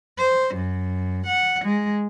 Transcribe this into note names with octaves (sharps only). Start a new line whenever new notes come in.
C5
F#2
F#5
G#3